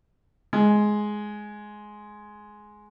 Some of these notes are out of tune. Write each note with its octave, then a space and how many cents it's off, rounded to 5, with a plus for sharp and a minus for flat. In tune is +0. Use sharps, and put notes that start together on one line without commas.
G#3 +10